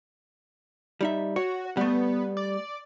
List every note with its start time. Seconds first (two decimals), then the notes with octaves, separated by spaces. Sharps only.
1.01 G3 D#4 E5
1.36 F#4 C#5
1.77 G3 A3 B3
2.37 D5